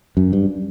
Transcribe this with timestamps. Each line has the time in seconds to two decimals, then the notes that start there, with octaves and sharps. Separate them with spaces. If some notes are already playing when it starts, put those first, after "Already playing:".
0.17 F#2
0.33 G2